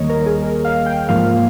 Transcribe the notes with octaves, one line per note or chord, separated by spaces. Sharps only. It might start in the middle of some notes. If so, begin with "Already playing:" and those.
Already playing: D#2 D#3 G3 A#3 C#5 D#5
A#4
G#4
A#4
F5
G5
G#2 F3 A#3 F5